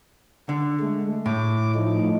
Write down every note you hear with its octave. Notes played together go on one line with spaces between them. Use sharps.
D3
G#3 A3
A2 D6
F3 A3 D#4